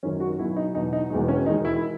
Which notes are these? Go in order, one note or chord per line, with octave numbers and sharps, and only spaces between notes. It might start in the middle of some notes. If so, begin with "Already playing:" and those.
G#1 F#2 D#3 C#4
F#4
B1 B2 F#3 E4
D#4
E2 B2 F#3 D#4
D#4
E1 E2 B2 G#3 D#4
C#4
E1 D#2 D#3 G#3 D#4
E4